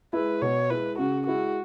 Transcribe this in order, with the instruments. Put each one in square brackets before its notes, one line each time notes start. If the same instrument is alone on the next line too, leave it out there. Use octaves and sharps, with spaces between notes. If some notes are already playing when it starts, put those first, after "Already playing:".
[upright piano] G#3 E4 [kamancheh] B4
[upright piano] B2 [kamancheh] C#5
[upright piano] G#3 E4 [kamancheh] B4
[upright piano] C#3 [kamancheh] F#4
[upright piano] G#3 E4 [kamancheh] F#4